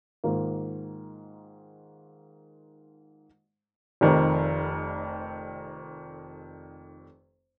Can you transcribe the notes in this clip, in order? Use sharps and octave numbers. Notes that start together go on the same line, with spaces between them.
G#2 D#3 A#3 F4
F1 F2 D#3